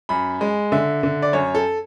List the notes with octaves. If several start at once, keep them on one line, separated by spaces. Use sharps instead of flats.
F#2 B5
G#3
D3 E5
D3
D5
F#2 C#5
A4